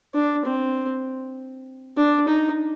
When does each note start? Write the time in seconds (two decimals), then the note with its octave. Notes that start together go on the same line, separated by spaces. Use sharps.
0.14 D4
0.45 C4
1.97 D4
2.28 D#4